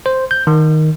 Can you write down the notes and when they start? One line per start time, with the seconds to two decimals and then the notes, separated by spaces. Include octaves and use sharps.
0.06 C5
0.31 G6
0.47 D#3